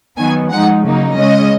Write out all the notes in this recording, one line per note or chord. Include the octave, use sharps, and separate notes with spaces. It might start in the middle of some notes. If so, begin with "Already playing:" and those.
D#3 F#3 B3 G#5
F3 G#3 D#4 F#5
C#3 F#3 A#3 D#4
C#3 G#3 C#4 D#5